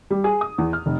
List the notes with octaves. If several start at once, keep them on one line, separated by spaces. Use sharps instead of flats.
G3
G#4
D#6
E2
F6
F1